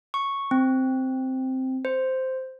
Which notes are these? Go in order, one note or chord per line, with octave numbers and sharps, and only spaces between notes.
C#6
C4
C5